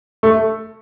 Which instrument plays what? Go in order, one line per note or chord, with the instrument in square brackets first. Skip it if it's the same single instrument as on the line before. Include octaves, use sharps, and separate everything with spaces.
[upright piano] A3